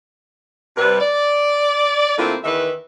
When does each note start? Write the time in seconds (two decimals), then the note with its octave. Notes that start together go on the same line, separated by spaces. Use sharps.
0.77 C3 G3 B4
1.01 D5
2.18 D3 A3 A#3 C4 E4 F4
2.44 E2 D#3 E3 B4 E5